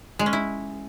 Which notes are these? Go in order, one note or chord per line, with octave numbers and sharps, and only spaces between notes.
G#3
C#4
E4